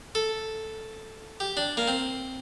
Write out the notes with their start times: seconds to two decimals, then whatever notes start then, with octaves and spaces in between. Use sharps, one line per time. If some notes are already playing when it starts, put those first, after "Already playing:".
0.15 A4
1.40 G4
1.57 D4
1.77 A#3
1.88 C4